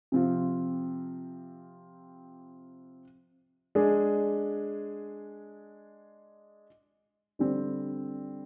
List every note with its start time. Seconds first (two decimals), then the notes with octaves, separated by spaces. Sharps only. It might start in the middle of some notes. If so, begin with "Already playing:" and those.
0.12 C3 F3 C4 F4
3.75 G#3 D4 G#4
7.39 D3 G3 C4